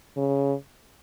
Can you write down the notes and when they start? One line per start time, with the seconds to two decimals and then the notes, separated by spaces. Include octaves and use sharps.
0.17 C#3